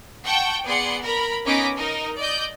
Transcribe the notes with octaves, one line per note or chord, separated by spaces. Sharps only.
F#5 G5 A5 C#6 G6
B3 G#4 D5 F#5 C6 C#7
A#4 A#5 B5
B3 C#4 D#4 D6 A#6 B6
D#4 A#4 D#5
D5 D#5 G6